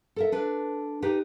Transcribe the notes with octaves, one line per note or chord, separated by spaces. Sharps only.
A4 A#4 E5
D4 A4 B4
D#4 G4 B4